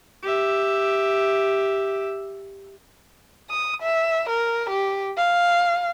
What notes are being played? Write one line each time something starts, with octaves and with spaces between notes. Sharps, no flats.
G4 E5
D#6
E5
A#4
G4
F5